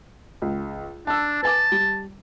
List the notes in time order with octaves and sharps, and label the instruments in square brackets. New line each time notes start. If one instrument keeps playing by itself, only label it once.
[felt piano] C#2
[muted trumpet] D4 [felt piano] A5 E6
[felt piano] B4 G#5 D6 [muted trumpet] A5
[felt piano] G3